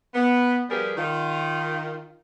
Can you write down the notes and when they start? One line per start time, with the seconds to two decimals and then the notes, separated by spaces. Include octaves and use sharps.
0.14 B3
0.70 F3 G3 G4 G#4 A#4 B4
0.97 D#3 F4